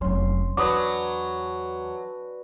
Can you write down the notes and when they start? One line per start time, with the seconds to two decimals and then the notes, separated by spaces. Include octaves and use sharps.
0.01 F1 F#3 C#4 C6
0.57 E2 F#3 D4 B4 D6 D#6